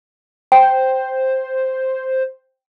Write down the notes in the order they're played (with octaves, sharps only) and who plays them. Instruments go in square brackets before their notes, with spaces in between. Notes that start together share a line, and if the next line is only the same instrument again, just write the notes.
[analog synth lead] C5 [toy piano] G5